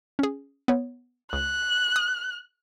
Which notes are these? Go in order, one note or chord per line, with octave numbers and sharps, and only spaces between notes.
C#4 G#4
B3 C#5
C#2 F#6
D#6